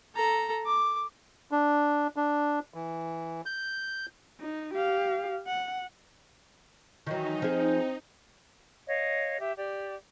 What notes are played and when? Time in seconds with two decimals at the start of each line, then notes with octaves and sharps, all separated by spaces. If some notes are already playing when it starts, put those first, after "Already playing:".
0.15 A4 A#5
0.66 D6
1.51 D4
2.16 D4
2.74 E3
3.46 G6
4.40 D#4
4.74 G4 F5
5.47 F#5
7.06 D#3 E3 F#3 D#4
7.42 F3 C4 G#4
8.88 C#5 D#5 F5
9.38 G4 E5
9.56 G4 D5